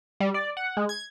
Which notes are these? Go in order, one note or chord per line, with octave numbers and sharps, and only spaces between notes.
G3
D5
F#5
G#3
G#6